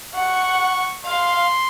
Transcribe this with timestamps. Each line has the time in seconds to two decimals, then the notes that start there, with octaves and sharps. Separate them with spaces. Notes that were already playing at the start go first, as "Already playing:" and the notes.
0.15 F#5 C#6
1.05 F5 C6